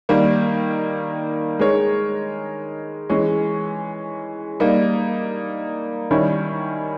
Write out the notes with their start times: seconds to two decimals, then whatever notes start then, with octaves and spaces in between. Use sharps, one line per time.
0.09 D#3 G3 A#3
1.59 G#3 D#4 A#4 C#5
3.10 E3 G#3 C#4
4.60 G3 A#3 D#4
6.11 D#3 G3 C#4 E4